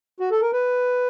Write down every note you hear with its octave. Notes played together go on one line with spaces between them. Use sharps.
F#4
A4
A#4
B4